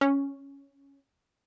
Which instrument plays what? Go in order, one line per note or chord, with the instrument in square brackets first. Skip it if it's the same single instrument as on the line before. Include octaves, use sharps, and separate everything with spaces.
[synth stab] C#4